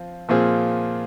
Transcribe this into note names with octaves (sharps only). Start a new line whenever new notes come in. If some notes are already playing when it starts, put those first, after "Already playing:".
Already playing: F3 C4
A#2 F3 C4 F4 G#4